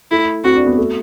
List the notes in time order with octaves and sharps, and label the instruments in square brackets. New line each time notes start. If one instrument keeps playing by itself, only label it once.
[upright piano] A3 [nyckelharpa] E4
[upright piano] C4 [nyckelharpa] F#4
[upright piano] D4
B3
A3